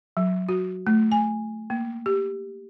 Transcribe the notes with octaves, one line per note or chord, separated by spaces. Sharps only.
F#3
F#4
A3
G#5
A#3
G4